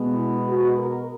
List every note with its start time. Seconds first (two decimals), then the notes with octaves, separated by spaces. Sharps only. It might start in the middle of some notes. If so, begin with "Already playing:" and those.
Already playing: B2 G#3 B3
0.14 E4
0.46 F#4
0.79 A#4